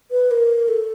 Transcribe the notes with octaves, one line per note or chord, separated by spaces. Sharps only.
B4
A#4
A4